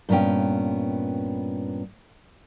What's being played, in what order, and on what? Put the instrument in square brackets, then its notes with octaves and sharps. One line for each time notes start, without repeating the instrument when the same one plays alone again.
[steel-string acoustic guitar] G2 A#2 B3 C#4 G5